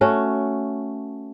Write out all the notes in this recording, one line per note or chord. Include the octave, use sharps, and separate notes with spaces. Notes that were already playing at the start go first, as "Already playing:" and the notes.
A3 C#4 F#4